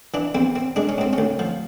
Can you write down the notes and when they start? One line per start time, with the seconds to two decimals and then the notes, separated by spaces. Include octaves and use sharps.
0.14 E3 D4
0.35 E2 C4
0.56 C4
0.76 G#3 D4
0.89 C#4
0.98 G#2 C4
1.13 C#4
1.18 D2
1.39 F3